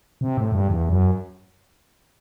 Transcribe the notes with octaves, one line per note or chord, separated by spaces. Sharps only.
C3
A2
G2
E2
F#2